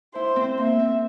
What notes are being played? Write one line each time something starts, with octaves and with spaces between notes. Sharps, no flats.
E4 C5
C4
A#3 E5
C4